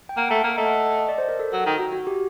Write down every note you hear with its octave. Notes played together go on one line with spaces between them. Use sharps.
G5
A#3 F#5
A3
A#3
A3 D#5
F#5
D#5
D#5
D5
C5
A#4
A4
F#3
D#3
F#4
F#4
G4